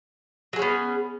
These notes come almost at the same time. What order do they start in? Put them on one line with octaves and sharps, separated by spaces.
F#3 G#4 C#4 B3